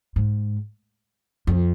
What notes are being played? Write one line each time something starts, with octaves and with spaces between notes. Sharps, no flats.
G#2
F2